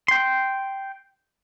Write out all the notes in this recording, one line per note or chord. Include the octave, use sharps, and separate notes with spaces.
G5 C6